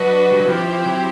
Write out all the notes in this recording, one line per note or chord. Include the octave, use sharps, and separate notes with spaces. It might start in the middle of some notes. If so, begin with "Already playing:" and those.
Already playing: F#3 D4 F#4 B4 D#5
G3
F#3
F3 C4 E4 G4 C5
F#3